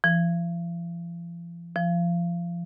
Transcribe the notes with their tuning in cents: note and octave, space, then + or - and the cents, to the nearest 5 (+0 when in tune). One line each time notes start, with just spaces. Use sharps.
F3 -45
F3 -25